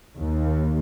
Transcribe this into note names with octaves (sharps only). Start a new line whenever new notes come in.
D#2